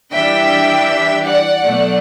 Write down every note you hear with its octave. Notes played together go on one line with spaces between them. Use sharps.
E3 G3 D4 E5 G5
D5 F#5
B2 F#3 A3 D4